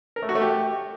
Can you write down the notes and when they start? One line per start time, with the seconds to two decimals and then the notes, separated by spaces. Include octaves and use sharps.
0.16 A#4
0.23 A3
0.29 F#4
0.35 A3
0.42 G4